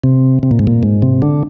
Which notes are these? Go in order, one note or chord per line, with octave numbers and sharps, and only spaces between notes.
C3
C3
A#2
G#2
A#2
G#2
C3
D3